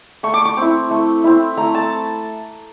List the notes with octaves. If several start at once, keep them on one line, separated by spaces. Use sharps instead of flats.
A3 C#6
D6
C#6
C4 E4
A3
C4 E4
A3 A#5
A5